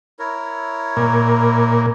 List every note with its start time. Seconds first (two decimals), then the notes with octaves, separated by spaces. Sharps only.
0.19 E4 A#4 C#5
0.97 A#2